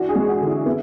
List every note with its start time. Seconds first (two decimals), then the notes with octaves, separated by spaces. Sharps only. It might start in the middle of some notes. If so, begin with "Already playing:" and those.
Already playing: E3 D4 F#4
0.09 G#4
0.16 G#3
0.28 F#4
0.41 D3
0.47 E4
0.66 B3 E4